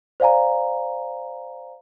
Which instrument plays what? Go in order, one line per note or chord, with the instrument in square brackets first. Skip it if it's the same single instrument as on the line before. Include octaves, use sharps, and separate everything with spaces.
[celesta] C5 D5 F5 G#5 A#5